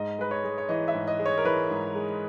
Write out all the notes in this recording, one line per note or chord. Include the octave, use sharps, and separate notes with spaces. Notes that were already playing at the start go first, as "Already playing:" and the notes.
Already playing: G#2 D#5
G#3 B4
C#5
G#3
C#5
E3 D#5
E5
G#2
D#5
G#3
C#5
A#4
E3 B4
G#2
G#3